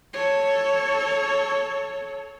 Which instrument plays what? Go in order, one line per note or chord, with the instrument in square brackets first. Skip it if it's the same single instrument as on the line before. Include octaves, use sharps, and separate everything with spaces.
[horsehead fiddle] A4 C#5